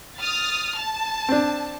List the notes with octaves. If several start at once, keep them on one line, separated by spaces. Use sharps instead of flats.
D#6 F6 A6
A5
C4 D4